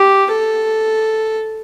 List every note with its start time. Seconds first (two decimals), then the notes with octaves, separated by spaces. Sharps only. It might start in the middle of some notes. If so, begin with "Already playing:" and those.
Already playing: G4
0.31 A4